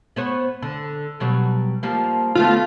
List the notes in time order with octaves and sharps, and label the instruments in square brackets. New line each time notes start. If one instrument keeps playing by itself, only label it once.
[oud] B3 C5 C#5
D3
B2 F#3 G3
F3 G3 A#3
[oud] D3 A3 B3 [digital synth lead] F4